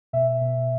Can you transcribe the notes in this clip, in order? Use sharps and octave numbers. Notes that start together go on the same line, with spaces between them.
B2 E5
B2